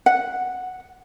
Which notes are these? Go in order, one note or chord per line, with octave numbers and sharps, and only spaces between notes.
F#5